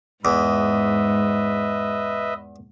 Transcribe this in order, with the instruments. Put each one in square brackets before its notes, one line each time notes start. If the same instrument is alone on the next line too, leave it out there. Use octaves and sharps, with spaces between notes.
[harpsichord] E2 [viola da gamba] G#2 [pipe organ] B4 D#5 E5